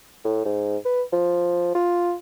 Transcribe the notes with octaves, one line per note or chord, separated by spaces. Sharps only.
A2
G#2
B4
F3
F4